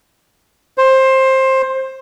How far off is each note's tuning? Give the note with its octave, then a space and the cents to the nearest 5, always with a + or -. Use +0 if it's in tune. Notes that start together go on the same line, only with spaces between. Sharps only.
C5 +15